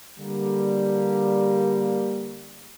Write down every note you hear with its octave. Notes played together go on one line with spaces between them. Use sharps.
D3 G3 A#3